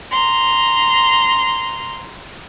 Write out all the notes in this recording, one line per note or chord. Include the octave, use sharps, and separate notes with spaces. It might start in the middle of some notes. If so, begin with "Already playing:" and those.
A#5 C6